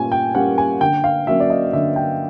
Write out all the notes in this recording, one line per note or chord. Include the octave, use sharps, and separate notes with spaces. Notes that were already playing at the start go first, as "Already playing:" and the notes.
Already playing: A#2 G3 A#3 C#4 G#5
G5
G3 A#3 C#4 F#5
G#5
D3 G5
F5
F#3 A#3 C#4 E5
D5
D#5
D3 E5
G5